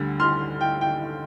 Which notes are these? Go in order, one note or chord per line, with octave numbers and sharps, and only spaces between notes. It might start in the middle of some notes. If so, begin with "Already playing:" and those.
Already playing: D2 D3 G3
C6 F6
G5
G5